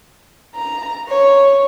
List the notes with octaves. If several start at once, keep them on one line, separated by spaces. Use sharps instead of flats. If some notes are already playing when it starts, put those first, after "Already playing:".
A#5
C#5